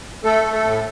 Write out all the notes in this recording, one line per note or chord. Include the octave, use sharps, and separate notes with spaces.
A3 A4
A3
A4
A2